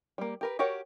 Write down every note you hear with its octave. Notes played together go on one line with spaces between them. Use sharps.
G3 A#3
G4 A#4 B4
F#4 G4 A#4 C#5 F#5